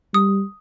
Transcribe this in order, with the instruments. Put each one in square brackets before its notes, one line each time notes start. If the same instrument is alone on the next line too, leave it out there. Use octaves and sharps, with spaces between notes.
[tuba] G3 [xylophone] D#6